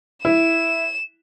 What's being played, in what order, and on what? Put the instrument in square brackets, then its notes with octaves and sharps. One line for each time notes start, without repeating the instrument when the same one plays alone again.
[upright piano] E4 [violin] E7